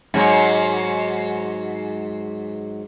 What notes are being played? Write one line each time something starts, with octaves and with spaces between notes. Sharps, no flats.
G#2 F#3